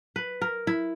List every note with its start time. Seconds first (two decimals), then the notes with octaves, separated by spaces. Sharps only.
0.16 B4
0.42 A#4
0.67 E4